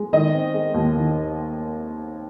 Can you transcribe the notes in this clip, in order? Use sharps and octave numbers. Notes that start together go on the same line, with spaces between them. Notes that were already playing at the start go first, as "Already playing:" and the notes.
Already playing: G#3
D#3 D#5
C4
G#3
D#2
D#3